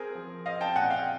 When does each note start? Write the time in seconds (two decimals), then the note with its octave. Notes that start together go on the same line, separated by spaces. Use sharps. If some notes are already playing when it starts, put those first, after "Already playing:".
Already playing: C4 G#4 A#4
0.15 F3
0.45 C4 D#5 F5
0.61 G5 A5
0.75 A#2 F#5 G#5
0.90 F5 G5